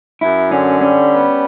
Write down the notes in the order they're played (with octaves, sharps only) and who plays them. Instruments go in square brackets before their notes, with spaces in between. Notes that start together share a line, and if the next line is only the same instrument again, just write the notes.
[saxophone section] F#2 [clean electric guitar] E4
[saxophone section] D3 [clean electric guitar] C#4
[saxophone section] G3 [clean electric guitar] C#4
[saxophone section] B3